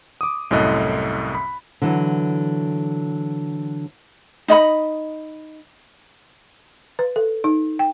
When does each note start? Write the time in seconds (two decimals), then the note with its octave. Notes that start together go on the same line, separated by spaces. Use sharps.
0.21 D6 D#6
0.51 C2 F#2 A2 A4 D#5 F#6
1.35 B5
1.82 D3 E3 F#3
4.48 D#4 D#5 B5
6.99 B4
7.16 A4
7.44 D#4
7.79 G5